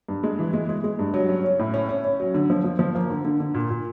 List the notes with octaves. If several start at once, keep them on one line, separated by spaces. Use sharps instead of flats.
G2
G#3
E3
G#3
G#3
G#3
G2
F#3
C#4
C#4
A2
C#4
C#4
C#4
F#3
D3
F3
F3
F3
A#3
D3
D3
D3
A#2
A#2